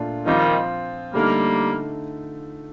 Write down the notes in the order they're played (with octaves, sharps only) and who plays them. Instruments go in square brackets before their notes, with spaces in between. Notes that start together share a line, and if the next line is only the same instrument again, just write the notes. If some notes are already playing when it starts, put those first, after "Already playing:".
Already playing: [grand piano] A#2 A3 D4 F4
[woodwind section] D#3 G3 [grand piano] F3 C4 F4
[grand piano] D3 A3 D#4 [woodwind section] G3 A#3